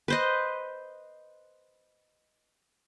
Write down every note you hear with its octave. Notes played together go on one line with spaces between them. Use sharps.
B4 C5 D#5